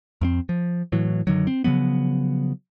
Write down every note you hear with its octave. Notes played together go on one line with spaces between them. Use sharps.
F2 A#3 C4
F3
A2 E3 F#3
F#2 D3 D#3 F#3
C4
C#3 F3 F#3 B3